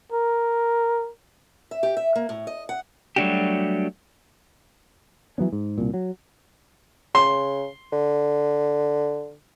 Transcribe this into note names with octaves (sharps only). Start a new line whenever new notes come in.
A#4
E5
G4
E5
A#3
A2
D#5
F#5
F#3 G3 A3 D4 F#4 G4
E3 F#3 B3 C#4
G#2
C2 A#2
F#3
C#3 C6
D3